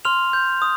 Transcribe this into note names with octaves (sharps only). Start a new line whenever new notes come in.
C6 F6 F7
G6
D#6